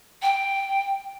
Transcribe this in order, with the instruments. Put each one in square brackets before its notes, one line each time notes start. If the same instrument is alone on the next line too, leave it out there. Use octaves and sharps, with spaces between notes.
[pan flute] G5